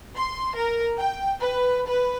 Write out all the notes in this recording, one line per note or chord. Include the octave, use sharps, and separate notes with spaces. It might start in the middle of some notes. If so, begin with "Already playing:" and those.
C6
A#4
G5
B4
B4